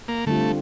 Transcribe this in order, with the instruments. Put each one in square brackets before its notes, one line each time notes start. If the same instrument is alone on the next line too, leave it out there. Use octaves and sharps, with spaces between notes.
[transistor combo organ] A#3
[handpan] D3 G3 C4 F4 [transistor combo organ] A3